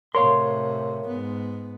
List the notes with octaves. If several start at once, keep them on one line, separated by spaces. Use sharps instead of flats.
A2 C3 A#4 C#5 F5 C6
G#2 B3